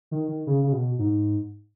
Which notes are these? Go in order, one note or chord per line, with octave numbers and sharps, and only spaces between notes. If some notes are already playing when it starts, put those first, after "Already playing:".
D#3
D#3
C#3
C#3
B2
G#2